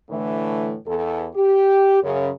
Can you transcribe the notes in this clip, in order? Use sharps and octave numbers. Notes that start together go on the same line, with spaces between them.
A2 D3 E3 A3
E2 A4
G4
F#2 C#3